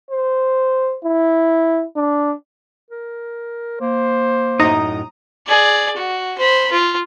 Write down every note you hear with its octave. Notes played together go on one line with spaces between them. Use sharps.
C5
E4
D4
A#4
A#3 C5
F#2 A2 D#4 A#5 D#6
G#4 D5
F#4
C5 B5
F4